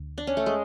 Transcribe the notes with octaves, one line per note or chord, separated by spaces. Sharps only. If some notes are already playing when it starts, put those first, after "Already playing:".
Already playing: D2
D4
C#4
A3
G#3